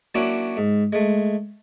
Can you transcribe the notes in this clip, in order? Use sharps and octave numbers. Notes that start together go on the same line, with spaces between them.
F#3 A#3 C#4 D4 E4 F#4
G#2
G#3 A3